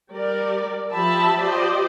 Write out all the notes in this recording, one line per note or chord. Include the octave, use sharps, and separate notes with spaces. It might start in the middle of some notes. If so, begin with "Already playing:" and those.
G3 A#4 D5
F3 G4 E5 A5 B5
F4 G4 C5 D5 D#5